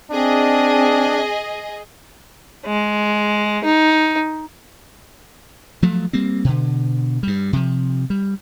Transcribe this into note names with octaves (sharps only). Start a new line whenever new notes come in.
C4 D4 G#4 D#5
G#3
D#4
F3 F#3 A3
G3 A#3 C4
B2 D3
G2 G3
C3 F3
G3